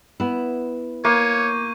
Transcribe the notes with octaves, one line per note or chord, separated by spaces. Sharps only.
B3 E4
A#3 C#5 C#6 G6 D#7